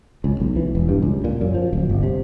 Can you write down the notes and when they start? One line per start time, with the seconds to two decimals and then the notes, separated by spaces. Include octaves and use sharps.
0.24 C#2
0.40 B1
0.56 E3
0.75 E1
0.89 G2
1.02 C#2
1.24 A#2
1.41 F#2
1.54 F3
1.73 D1
1.89 G1
2.03 C3